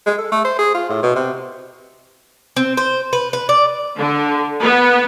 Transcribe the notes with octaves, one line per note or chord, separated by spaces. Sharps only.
G#3
A4
A3
C5
G#4
F4
A2
B2
C3
C4
C5
B4
B4
D5
D3
B3